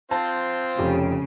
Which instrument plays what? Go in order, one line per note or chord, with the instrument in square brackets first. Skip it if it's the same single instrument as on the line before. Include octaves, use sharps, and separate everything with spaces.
[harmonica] C4 F4 C5 [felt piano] A5
[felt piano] F1 G4 [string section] C#3